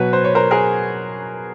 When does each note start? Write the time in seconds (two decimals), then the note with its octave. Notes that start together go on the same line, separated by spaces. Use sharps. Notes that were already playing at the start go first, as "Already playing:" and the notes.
Already playing: B2 F#3 B4 C#5
0.13 C5
0.24 C#5
0.35 A#4 C5
0.51 G#4 A#4